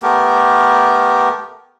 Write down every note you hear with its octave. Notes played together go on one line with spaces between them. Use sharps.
A3 B3 G4 A#4